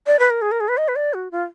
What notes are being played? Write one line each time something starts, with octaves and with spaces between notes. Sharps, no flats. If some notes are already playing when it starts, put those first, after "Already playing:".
D5
B4
A#4
G#4
A#4
G#4
B4
D#5
B4
D5
F#4
F4